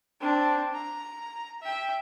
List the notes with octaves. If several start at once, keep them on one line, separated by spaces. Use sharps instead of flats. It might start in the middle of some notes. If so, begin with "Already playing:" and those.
C4 D4
A#5
E5 G5